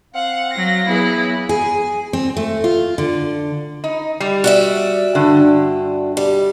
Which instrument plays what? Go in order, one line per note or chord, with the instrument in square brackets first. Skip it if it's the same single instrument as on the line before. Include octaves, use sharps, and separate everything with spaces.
[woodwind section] C4 F5 [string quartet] F#5
[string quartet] F#3 A#6
[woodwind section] E3 F#3 G#4 [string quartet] B3 E4
[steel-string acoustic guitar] G#4
C4
A3
F4
D3
[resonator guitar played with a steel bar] D#4
G3
[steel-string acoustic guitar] F#4 D5 E5
[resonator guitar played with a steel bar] G2 D3
[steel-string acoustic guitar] G3